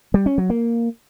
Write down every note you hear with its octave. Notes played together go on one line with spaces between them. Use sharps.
G3
C#4
F#3
A#3